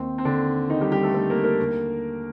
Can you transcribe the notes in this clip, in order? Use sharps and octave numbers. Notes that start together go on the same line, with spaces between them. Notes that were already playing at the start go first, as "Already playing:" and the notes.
Already playing: D#2 D#3 C4
C4
D3 D4
D#3 D#4
G3 G4
G3 G4
A3 A4
A3 A4
A#3 A#4
A#3 A#4
D#2 D3